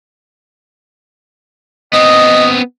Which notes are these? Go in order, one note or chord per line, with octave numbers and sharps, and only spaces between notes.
B3 C4 D#5 D#6